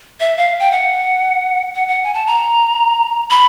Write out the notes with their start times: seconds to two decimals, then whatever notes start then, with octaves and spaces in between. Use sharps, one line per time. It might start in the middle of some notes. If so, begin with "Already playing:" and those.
0.20 E5
0.37 F5
0.60 G5
0.71 F#5
1.75 F#5
1.88 F#5
2.04 G#5
2.14 A5
2.27 A#5
3.30 B5